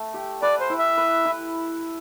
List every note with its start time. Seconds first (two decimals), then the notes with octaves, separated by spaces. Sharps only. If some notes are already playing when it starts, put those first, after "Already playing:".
Already playing: A3
0.14 G4
0.42 B4 D5
0.60 C5
0.70 E4
0.79 E5
0.97 B4
1.25 E4